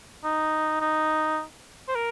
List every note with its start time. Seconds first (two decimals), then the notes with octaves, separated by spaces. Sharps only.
0.24 D#4
0.81 D#4
1.88 C5
1.95 A#4